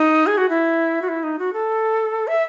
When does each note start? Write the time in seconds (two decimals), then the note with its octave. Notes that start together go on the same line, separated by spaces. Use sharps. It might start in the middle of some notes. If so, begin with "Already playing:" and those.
Already playing: D#4
0.27 G#4
0.37 F#4
0.49 E4
1.02 F#4
1.09 E4
1.23 D#4
1.39 F#4
1.53 A4
2.27 E5